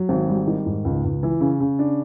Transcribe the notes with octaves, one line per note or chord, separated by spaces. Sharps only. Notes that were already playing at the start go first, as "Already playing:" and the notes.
Already playing: F#3
G#1
G3
D#3
G#2
C#2
C#2
E3
C#3
C#3
D4